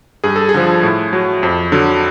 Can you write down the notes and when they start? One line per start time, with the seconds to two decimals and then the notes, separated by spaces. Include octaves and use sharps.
0.24 G2 G#4
0.36 A4
0.49 G#4
0.54 D3 F3
0.83 A2
1.13 F#3
1.43 F2
1.72 D3 F#3